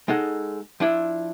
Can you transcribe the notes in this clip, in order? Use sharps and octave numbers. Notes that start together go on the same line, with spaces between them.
G#3 D#4 A4 F#5
F3 D4 E4